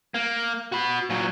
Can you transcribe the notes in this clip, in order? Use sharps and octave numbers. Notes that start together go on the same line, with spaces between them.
A#3
F#4 B5
A#2 F#3